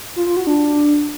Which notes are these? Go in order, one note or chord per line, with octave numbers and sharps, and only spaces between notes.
F4
F4
F#4
D4